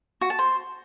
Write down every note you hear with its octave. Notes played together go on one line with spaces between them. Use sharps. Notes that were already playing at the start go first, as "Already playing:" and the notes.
F#4
A5
C5